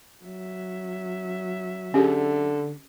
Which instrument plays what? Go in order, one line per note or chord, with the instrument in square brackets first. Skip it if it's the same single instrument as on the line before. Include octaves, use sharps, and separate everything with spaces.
[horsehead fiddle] F#3 E5
[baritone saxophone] D3 [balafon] C#4 G4 G#4